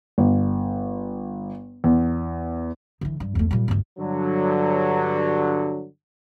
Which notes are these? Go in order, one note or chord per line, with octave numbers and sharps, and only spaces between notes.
G1
E2
D3 E3
G2
E2 A3
A#2 G3
G1 D2
G2 D3 F#3